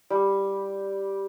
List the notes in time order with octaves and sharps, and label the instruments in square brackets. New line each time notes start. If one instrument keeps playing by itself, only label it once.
[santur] G3